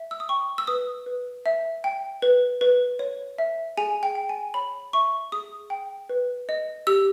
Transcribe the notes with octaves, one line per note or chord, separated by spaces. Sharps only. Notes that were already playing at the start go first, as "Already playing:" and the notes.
Already playing: E5
E6
D#6
G5 C#6
E6
B4 D#6
B4
E5
G5
B4
B4
C#5
E5
G#4 G#5
G5
G5
G#5
C#5 B5
E5 C#6
G#4 D#6
G5
B4
D#5
G4 E6